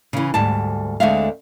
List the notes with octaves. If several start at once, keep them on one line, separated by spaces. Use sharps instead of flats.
C#3 E3
D2 G#2 G3 A5
D2 D3 G#3 C4 E5 F5